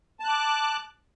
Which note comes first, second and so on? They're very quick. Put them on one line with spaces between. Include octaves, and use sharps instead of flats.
A5 F#6 D6